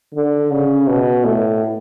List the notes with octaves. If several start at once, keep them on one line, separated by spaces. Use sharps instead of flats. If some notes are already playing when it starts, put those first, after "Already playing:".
D3
C#3
B2
A2